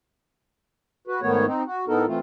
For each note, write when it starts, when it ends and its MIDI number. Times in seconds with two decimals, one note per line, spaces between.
1.07 1.20 66
1.07 1.20 71
1.22 1.46 44
1.22 1.46 51
1.22 1.46 57
1.22 1.46 59
1.22 1.46 73
1.46 1.63 60
1.46 1.63 63
1.67 1.85 66
1.88 2.06 45
1.88 2.06 59
1.88 2.06 63
1.88 2.06 69
1.88 2.06 70
2.07 2.19 52
2.07 2.19 57
2.07 2.19 60
2.07 2.19 65